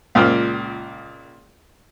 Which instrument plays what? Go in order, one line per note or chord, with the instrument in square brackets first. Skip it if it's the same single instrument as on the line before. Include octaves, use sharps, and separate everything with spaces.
[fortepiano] C#2 A#2 G5 F6